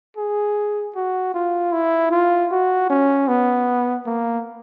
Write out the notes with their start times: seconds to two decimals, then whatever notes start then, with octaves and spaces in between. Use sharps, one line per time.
0.17 G#4
0.95 F#4
1.34 F4
1.72 E4
2.11 F4
2.51 F#4
2.90 C#4
3.28 B3
4.06 A#3